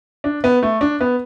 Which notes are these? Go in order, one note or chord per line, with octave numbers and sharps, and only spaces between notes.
D4
B3
A3
D4
B3